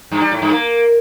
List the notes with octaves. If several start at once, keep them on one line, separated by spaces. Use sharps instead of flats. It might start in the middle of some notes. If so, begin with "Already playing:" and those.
G2
G3
A2
G2
A#3